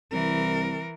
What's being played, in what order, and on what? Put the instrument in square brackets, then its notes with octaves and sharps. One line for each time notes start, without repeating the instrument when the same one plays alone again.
[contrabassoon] C2 [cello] E3 A#4